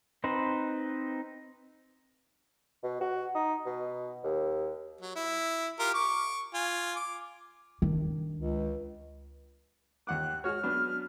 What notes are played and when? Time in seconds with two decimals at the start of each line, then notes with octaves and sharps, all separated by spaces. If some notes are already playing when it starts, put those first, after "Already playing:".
0.24 C4 D#4 B4 C5
2.83 B2
3.01 F#4
3.35 D#4
3.66 B2
4.24 D#2
5.01 F#3
5.16 E4
5.79 F4 G4 A#4
5.94 C#6 D6
6.54 F4 G#5
6.96 D6
7.82 D#3 D4
8.36 C#2
10.07 D#2 F#5 D6 F#6
10.44 G#3 F#4 C#5 F6
10.63 F#3 B3 D4